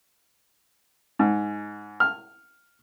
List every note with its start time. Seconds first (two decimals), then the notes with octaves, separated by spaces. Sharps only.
1.19 G#2
2.00 F6